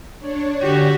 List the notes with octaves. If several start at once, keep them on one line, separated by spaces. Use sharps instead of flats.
D4 C#5
D3 F#4 G4 D5